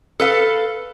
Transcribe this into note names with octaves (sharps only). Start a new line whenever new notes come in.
A4 B4 F5